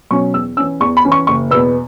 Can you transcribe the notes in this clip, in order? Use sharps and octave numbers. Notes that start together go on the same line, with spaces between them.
B2 F#3 C#4 C#6
E2 E6
E3 C#4 E6
E2 C#6
B5
E3 C#4
C#6
F#1 C#6
E2 B2 B3 E6